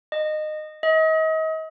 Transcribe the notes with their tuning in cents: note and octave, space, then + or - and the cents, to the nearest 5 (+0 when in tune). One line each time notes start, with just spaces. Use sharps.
D#5 -20
D#5 +35